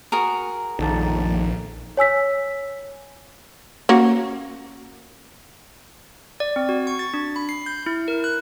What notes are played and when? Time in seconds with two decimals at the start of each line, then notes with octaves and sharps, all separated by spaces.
0.12 F#4 G#4 A#4
0.79 A#1 F2 D#3 A4
1.97 C#5 G#5 E6 B6
3.89 A#3 C#4 F#4
6.40 D5
6.56 C4
6.69 F#4
6.87 C#6
6.99 A6
7.14 D4
7.36 B5
7.49 C7
7.66 G6
7.86 E4
8.08 A#4
8.24 F#6